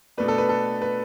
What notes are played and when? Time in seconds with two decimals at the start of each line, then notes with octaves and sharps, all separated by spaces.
0.18 B2 A3 D4 B4
0.28 A4
0.38 B4
0.49 A4
0.82 B4